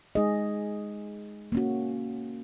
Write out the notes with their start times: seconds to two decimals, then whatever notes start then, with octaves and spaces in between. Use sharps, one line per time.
0.15 G#3 D#4 G#4 D#5
1.52 A#3 C#4 F#4